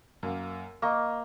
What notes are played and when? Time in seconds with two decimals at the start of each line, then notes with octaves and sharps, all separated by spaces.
0.23 F#2 A#3
0.82 A#3 D#5 C#6